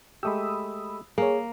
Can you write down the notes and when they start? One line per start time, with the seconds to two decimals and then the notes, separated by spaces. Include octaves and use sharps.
0.23 G#3 A3 G4 B5 D#6 E6
1.18 A#3 G#4 C#5